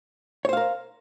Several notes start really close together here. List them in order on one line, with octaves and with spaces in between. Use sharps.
C#5 C5 F5 A#4